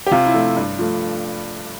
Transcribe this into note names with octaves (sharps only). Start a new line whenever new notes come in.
G4
C3 F4
E4
F3 A3
G2
F3 A3